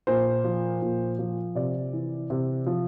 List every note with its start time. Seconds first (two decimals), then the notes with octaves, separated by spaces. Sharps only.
0.07 A#2 C5
0.44 F3
0.82 A#2
1.19 F3
1.55 C3 D5
1.93 E3
2.30 C3
2.66 F3